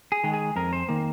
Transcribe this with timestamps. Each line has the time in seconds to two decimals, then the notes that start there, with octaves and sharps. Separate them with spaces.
0.12 G#4
0.24 D#3 G#3
0.34 G#4
0.56 F2 A#4
0.73 C5
0.89 D#3 A#3